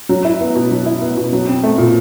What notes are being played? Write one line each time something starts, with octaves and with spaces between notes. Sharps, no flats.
F#3
E4
B3
B2
F#3
E4
B3
B2
F#3
C4
A3
A#2